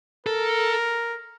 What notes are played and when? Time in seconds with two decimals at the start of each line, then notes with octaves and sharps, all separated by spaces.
0.26 A4 A#4